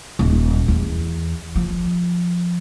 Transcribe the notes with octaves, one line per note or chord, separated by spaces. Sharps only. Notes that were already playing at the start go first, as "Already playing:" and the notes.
D#1
E2
F3